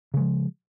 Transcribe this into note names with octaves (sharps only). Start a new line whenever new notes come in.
C#3 F3 G#3